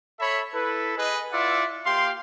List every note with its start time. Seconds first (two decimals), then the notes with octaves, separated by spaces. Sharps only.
0.20 A4 C#5 E5 B5
0.54 E4 A4 B4
0.97 G#4 B4 D#5
1.32 E4 F4 D5 E5 F#5
1.85 A#3 G4 F5 G5 C6